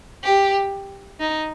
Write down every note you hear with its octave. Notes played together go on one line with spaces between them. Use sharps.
G4
D#4